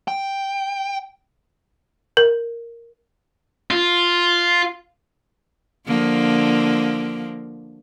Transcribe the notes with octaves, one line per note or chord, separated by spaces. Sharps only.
G5
A#4
F4
D3 F3 A#3